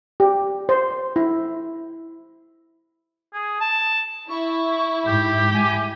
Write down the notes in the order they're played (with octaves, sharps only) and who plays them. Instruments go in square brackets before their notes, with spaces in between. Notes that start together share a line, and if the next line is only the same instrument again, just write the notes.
[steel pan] G4
C5
E4
[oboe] G#4
A5
[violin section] E4 [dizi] C#6
[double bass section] G#2 [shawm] G4 [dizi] G6
[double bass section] G#3 [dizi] G#5